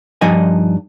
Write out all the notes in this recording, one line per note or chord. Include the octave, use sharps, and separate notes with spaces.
G2 F3 D#4 D5 D#5 G#5